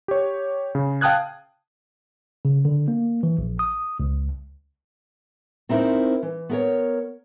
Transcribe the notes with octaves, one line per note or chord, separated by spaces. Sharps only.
G4 C#5
C#3
F5 G5 A5 D#6 F#6 G#6
C#3
D3
A#3
E3
A#1
D#6
C#2
C4 D#4 E4 A4 A#4 C5
E3
B3 A#4 C#5